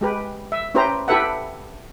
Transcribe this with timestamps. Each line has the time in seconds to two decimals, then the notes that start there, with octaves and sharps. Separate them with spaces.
0.01 G#3 G4 B4
0.52 E5
0.74 C#4 E4 G4 B4 C5 A#5
1.08 E4 G4 A4 B4 E5 F#5